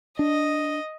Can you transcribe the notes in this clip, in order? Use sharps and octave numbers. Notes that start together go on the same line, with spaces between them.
D4 D#5